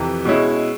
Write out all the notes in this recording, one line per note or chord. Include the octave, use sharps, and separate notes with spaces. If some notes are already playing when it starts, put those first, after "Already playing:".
Already playing: F2 C3 E3
B2 G#3 C#4 E4